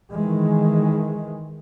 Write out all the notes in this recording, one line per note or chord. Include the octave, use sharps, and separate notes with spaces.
D#3 E3 G#3